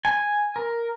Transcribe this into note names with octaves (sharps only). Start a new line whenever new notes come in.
G#5
A#4